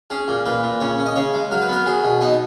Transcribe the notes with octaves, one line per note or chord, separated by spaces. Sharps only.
C#4 G#4
A#2
A#2 B4
A#2
C#3 C#5
C#4
D#5
C#3 C#5
G#3
F#3 A#4
B4
B3 A#4
F#3 G#4
B2
B3 D#4